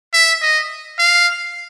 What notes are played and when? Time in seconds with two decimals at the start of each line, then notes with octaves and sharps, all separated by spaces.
0.13 E5
0.42 D#5
0.99 F5